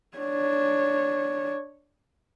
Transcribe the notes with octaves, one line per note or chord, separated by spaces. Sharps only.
D4 C#5